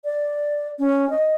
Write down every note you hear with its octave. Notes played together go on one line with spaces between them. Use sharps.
D5
C#4
D#5